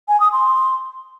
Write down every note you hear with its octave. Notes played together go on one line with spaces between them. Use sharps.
G#5
D#6
C6